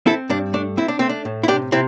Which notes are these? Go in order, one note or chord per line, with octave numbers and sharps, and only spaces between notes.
C4 E4 A4
G2 D4
A3 D4
C4 E4
D4
A3 C4
D4
A2
E4
C3 D4 G4
C3 C4 E4